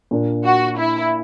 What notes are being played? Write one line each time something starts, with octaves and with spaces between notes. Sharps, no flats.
A#2 A#3 D4
F#4
E4